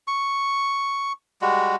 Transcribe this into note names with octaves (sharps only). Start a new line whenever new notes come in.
C#6
G3 G#3 F#4